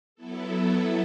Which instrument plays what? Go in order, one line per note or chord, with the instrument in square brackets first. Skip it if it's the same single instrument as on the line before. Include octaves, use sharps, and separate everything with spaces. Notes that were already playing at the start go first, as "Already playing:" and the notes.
[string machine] F#3 B3 E4 A4